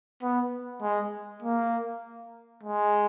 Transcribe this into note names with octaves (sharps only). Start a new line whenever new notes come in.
B3
G#3
A#3
G#3